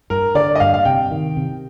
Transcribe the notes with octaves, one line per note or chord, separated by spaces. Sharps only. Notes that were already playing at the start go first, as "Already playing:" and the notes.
G2 A#4
D3 D5
D#5
G2 F5
F5
C3 G5
D#3
C3